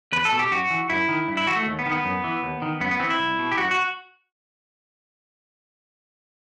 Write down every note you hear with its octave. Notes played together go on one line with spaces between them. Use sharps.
E2 B4
A4
B2
G4
F#2 F#4
E3
F#2 E4
D#3
G2
E4
E3 F#4
A3
D#2
B3
D#3
B3
F#2
E3
D#2
D#3
F#2 B3
B3
E3 C4
E4
C2
B2
G4
F#2 F#4
F#4